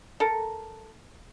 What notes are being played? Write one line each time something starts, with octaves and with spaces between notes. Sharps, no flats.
A4 A#4